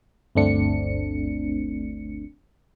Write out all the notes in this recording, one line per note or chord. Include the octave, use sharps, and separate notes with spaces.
G1 D2 A3 C4 D4 C#7